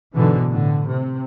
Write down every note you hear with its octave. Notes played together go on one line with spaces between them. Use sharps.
G#2 B2 D3 E3
A2 D3
C3